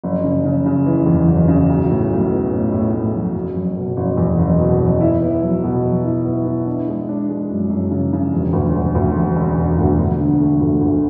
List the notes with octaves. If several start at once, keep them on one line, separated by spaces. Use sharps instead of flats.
F#1
C#3
C#3
C#3
E3
E2
F#1
C#3
B1
A2
B1
B3
A2
A2
A2
F#3
F#1
F#1
B2
F#1
E2
F#1
B2
F#1
E4
B3
F#3
B2
F#3
E4
B3
E4
D4
G#3
D4
G#3
F#2
F#2
C#3
C#3
E1
D2
E1
D2
E1
E1
E1
D2
D2
D3
A3
D2
D2